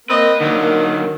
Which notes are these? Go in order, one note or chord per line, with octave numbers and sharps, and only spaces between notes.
A#3 C4 B4 D#5
D3 D#3 F#3